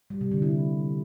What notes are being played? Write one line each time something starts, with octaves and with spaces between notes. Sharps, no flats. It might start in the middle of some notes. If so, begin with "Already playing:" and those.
G3
C3
D3
E4